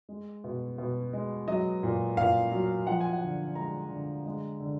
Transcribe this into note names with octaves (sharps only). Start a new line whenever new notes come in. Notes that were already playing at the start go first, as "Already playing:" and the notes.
G#3
B2
B2
G#3
F#3 D#5
A#2
A#2 F5
F#3
F3 F#5
G#5
F#5
D3
G#3 A#5
D3
G#3
D3